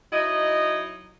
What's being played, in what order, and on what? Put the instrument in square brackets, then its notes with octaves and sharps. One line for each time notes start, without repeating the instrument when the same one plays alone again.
[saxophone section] F#3 D#4 E4 D#5